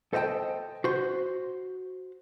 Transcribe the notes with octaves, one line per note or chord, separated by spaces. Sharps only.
A4 C5 D#5 E5 G5 A5
F#4 C5